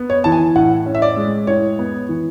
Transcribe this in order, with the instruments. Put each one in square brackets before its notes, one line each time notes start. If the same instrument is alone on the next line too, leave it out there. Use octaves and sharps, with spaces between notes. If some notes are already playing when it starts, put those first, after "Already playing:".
Already playing: [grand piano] B3
C#5
E3 A5
G#5
A2 F#5
C#4
E5
D5
G#3
A2 C#5
B3
E3